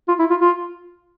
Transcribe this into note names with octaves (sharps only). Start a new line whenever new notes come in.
F4
E4
F4
F4